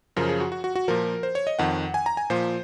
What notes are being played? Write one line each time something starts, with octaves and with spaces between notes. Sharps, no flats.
F#2 C#3 F3 A#4
G#4
F#4
F#4
F#4
F#4
A#2 F3 A#4
C5
C#5
D#5
F2 D#3 F#5
G#5
A#5
G#5
A#2 F3 C5